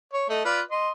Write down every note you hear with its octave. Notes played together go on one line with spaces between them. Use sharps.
C#5
A3 D#5
F4 B4 D5
D#5 C6